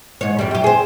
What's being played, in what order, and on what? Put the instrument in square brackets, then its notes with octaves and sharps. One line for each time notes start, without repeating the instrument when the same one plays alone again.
[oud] G#2 C#5
F2 G3
F#2 G4
G#4 C5